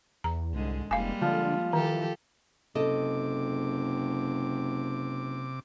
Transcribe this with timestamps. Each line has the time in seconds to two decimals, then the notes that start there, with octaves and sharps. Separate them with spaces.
0.24 E2 A#5
0.54 C2 G#2 D3 G#3
0.91 F1 G3 G#3 A#3 F5 G#5
1.21 D3 F3
1.73 D#3 E3 G4 A4
2.75 F#1 C3 A4 D#5 D6